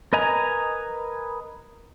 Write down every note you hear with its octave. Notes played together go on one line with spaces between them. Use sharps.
A#4 B4 D#5 G#5 A#5